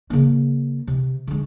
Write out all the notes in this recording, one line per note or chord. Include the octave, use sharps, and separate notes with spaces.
C#3 A#3
C3
D3 G#3